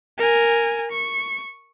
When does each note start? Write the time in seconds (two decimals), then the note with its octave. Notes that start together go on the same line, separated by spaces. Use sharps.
0.18 A#4 G#5
0.92 C#6